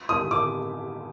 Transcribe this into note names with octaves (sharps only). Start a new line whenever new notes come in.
D#6
D6